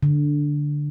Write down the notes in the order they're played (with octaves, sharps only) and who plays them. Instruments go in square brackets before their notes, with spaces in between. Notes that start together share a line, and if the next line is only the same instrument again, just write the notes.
[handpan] D3